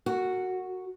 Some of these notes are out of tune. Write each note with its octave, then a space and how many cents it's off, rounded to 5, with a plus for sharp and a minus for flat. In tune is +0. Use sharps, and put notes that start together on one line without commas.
F#4 +0 A#4 -45